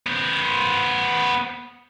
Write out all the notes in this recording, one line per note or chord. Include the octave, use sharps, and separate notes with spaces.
B3 C5